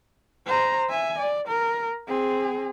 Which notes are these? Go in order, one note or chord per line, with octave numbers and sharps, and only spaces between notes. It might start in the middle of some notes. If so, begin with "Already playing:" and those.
C5 A#5
E5 G#5
D5
A#4
C4 G#4